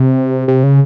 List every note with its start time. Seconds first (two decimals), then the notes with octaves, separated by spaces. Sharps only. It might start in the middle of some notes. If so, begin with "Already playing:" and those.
Already playing: C3
0.48 C3
0.63 C#3